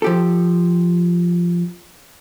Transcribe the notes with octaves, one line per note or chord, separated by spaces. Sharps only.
F3 G4 A4